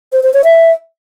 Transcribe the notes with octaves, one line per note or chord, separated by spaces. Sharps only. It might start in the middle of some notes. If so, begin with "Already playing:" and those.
C5
C5
C#5
E5